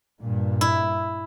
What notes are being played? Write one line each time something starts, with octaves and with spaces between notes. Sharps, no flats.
G2 A#2
E4